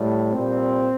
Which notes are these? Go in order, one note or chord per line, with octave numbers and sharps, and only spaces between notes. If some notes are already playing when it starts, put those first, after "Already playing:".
Already playing: A2 G3
A#2 G3 C4